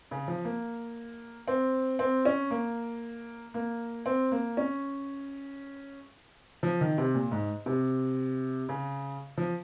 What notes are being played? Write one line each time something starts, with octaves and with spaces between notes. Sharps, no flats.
C#3
F3
A#3
C4
C4
C#4
A#3
A#3
C4
A#3
C#4
F3
D#3
C3
A#2
G#2
C3
C#3
F3